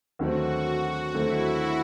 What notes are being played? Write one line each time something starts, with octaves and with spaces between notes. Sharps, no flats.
D#2 D3 F#3 A3 C4 F#4
D#2 D3 F#3 A3 C4 E4